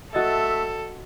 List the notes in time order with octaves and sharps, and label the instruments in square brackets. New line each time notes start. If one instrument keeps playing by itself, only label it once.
[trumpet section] A3 E5 [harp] F#4 D#5 A6 [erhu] A4